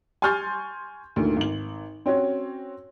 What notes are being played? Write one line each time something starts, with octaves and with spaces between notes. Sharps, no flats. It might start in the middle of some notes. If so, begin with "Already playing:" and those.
G#5 C6 C#6 F6 G6 A6
D2 A#2 D#3
G#1 F#7
C4 C#4 F#4 C#5